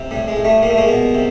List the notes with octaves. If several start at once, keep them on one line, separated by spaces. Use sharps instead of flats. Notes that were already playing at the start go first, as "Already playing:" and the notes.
Already playing: C3
A2 G3
G#3
A2
G3 A3
G3 A#3
A3
G#3 A#3
B2
C3